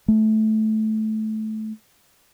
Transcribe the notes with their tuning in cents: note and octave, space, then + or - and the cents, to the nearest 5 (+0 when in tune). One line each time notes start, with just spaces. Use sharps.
A3 -15